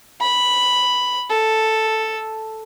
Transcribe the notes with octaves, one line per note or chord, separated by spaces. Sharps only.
B5
A4